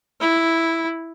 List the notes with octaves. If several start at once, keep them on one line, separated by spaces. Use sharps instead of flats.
E4